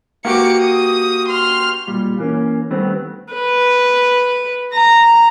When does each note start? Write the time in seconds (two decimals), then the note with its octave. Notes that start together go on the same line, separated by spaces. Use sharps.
0.25 A#3 F#4 G4 D6 C#7
0.61 D#6
1.28 C6 F6
1.87 B1 A#2 G3
2.18 E3 A#3 C#4
2.70 D#3 G3 A3 B3 C4
3.34 B4
4.74 A#5